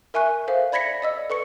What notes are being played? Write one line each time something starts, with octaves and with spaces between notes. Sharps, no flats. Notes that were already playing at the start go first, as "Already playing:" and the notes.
A#4 E5 G#5 C#6 F#6
A4 C5 E5 F5
D5 B5 G#6 A#6 B6 C#7
D5 D#5 E6
A4 B4 C#6 C#7